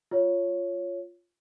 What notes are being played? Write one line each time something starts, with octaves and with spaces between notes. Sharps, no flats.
F4 C#5